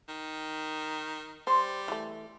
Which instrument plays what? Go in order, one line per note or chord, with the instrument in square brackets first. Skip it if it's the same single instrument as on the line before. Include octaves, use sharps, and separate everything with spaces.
[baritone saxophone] D#3
[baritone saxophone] G3 [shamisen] C5
[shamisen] E3 A3